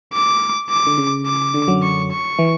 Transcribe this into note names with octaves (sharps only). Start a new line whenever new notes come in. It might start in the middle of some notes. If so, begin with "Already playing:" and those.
D6
D6
D3
C#3
D6
D3
F#2 F#3
C#6
C#6
E3